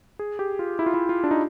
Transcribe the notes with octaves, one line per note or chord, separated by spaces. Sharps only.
G#4
G4
F4
E4
F4
E4
F4
D4
D#4